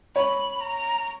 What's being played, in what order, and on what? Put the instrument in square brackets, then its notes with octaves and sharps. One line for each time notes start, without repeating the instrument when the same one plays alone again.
[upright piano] C#5 [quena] B5
[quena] A#5